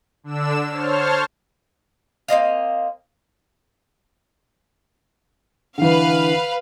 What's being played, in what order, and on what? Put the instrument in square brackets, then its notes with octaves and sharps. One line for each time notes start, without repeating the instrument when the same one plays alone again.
[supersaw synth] D3 D4 E6 E7
C5 C#5 A5 F6
[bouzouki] A#3 C4 D#5 F5
[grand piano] D3 E3 [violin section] B4 F5